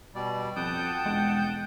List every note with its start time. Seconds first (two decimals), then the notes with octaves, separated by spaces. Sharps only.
0.15 B2 G3 D5
0.56 F2 F#5 G5 A5 D#6 G6
1.06 E1 G#3